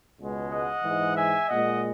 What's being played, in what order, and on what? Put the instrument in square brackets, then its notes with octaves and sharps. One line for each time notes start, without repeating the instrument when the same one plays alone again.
[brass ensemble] C#2 B2 G#3
D#5 F#5
G#2 E3 G#3
E5 G#5
A#2 G#3 D#5 F#5